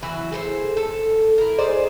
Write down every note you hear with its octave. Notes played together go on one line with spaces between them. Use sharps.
E3 F#3 E4 F#4
G#4 A4 B4 C5
A4
E4 A#4
D#4 G#4 C5 D5